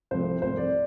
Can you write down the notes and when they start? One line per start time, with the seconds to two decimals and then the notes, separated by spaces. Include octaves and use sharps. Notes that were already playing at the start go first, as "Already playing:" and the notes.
0.11 C2 C3 F3 A3 C5
0.42 C2 C3 F3 A3 C5
0.57 D5